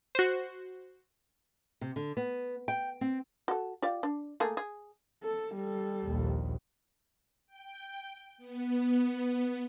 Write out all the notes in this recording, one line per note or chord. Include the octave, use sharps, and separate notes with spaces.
F#4 C5
C3
D3
B3
G5
C4
F#4 A4
F4 G4 D5
D4
A3 A#3 G#4
G#4
A4
G3 A4
A#1 D#2
G5
B3